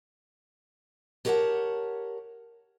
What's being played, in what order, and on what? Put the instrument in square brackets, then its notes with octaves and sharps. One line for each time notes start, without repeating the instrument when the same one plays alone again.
[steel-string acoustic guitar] G4 A#4 C#5 D5 F#5 A5